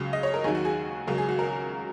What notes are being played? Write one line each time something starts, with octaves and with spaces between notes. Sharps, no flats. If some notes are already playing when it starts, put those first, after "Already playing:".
Already playing: C#2 C#3 F#3
D#5
C#5
A#4
D#2 D#3 F#3 G#4
F#4
G#4
C#2 C#3 F#3 A#4
G#4
F#4
A#4